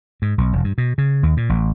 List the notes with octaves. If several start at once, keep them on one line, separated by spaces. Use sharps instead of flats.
G#2
B1
E1
G2
B2
C#3
D#2
A#2
A1